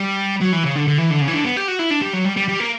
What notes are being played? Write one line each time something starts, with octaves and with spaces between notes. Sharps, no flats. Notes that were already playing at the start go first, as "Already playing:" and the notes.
Already playing: G3
F#3
E3
C#3
D3
D3
E3
D3
C#3
E3
D3
B3
G4
F#4
E4
D4
G3
F#3
G3
G3
G3
A#3